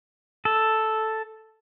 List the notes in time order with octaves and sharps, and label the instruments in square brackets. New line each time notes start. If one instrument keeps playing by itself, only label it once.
[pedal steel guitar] A4